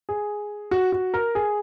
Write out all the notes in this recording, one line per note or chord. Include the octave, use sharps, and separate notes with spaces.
G#4
F#4
F#4
A#4
G#4